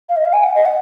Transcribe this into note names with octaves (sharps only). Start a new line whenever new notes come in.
F5
D#5
F5
G#5
F#5
D#5
F#5